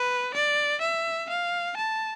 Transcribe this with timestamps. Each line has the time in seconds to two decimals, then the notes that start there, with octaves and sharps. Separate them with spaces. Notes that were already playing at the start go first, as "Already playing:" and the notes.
Already playing: B4
0.34 D5
0.82 E5
1.29 F5
1.77 A5